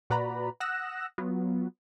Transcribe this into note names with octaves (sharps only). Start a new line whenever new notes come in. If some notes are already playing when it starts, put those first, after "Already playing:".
A#2 F#4 B4 D5 A#5 B5
F#5 D#6 E6 F#6 A#6 E7
F#3 B3 F4